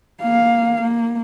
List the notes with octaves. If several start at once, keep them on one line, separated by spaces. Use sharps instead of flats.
A#3 F5
A#3